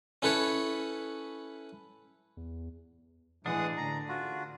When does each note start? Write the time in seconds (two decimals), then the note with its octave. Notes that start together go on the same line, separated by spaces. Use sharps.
0.22 C#4 E4 A4 B4 C#5
2.37 E2
3.46 A2 E3 G#3 D4 G#4 F#5 D#6
3.77 A1 D3 A#5
4.08 F4 F#4